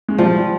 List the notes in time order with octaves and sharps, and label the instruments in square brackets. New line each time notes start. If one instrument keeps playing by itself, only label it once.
[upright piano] G#3
[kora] F3 [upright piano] G3